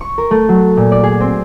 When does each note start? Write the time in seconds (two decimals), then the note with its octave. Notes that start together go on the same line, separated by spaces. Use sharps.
0.01 C#6
0.18 A#4
0.31 A3
0.49 F#3
0.77 A#2
0.92 D5
1.03 G#4
1.20 C4